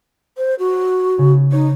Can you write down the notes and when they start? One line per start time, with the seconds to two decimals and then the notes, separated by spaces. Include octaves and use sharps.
0.37 C5
0.59 F#4
1.18 C#3
1.52 D#4 C#5